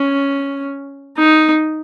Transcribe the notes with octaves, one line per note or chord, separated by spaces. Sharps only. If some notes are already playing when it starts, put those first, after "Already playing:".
Already playing: C#4
D#4